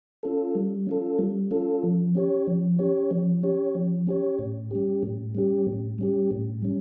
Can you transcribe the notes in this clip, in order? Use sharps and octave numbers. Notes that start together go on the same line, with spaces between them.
C#4 F4 A4
G3
C#4 F4 A4
G3
C#4 F4 A4
F3
C#4 G4 C#5
F3
C#4 G4 C#5
F3
C#4 G4 C#5
F3
C#4 G4 C#5
A2
G3 C#4 G4
A2
G3 C#4 G4
A2
G3 C#4 G4
A2
G3 C#4